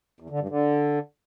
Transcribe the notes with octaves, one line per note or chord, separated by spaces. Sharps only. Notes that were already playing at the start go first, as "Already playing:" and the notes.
E2
D3
G2
D3